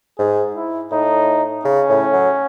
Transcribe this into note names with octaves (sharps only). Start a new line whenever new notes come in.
G#2 G#4
E4
A2 D#4
C#3 C#4
A2
F#3